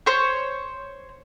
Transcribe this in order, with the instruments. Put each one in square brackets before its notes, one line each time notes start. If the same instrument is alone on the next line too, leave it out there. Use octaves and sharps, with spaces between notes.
[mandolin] C5 C#5